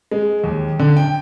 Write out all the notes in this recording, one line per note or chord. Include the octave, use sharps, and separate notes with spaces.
G#3
D#2
D3
G5